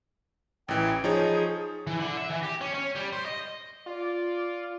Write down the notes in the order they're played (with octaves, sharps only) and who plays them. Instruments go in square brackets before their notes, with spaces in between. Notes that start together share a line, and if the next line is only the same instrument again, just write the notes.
[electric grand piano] A1 E3 [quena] G5
[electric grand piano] F3 D#4 C#5 [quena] G#4
[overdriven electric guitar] E3
D3
E5
E3
G4
C#4
C#4
G3
C5
D#5
[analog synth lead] F4 [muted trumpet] D5